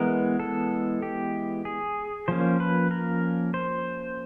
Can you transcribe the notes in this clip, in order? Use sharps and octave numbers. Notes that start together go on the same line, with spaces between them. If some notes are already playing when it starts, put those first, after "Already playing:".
Already playing: E3 G#3 B3 A#4
A4
G4
G#4
F3 A#3 C#4 C5
B4
A#4
C5